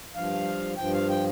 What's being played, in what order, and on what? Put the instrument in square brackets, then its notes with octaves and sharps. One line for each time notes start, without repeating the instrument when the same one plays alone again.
[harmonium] G2 F3 F5
G2 F3 G5
F5
G5